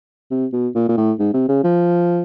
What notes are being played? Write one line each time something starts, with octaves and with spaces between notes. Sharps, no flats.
C3
B2
A#2
A#2
A2
G#2
C3
C#3
F3